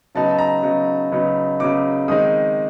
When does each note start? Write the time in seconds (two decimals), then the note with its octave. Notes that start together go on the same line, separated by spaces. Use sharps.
0.15 C#3 F#3 B3 D#4 A5
0.31 A5
0.38 A#5
0.63 C#3 F#3 B3 D#4
1.12 C#3 F#3 B3 D#4
1.60 C#3 F#3 B3 D#4 D6
2.08 D#3 G#3 C4 D#4 D#6